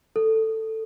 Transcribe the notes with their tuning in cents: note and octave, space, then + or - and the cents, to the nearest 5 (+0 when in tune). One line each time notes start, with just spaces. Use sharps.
A4 +10